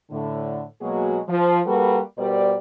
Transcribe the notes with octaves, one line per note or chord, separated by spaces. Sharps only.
A2 D3
B2 F#3 G#3 A#3 F#4 G#4
F3
G3 A#3 F#4 A4 B4
B2 G3 A#4 C5 D5